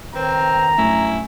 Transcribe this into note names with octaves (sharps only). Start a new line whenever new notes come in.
D#3 C4 B4 C#5 A#5
G2 F#3 A3 C#4 E4